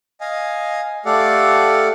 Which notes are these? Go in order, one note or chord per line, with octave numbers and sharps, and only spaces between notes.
D#5 F5 G#5
A3 G4 A4 D5 F5 F#5